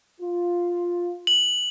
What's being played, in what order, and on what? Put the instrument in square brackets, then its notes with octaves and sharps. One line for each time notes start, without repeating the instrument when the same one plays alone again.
[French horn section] F4
[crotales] F#7